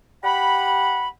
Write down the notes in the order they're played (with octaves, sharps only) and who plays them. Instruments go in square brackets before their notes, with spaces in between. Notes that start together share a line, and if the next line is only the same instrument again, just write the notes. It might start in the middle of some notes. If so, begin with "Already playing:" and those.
[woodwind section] G4 F#5 B5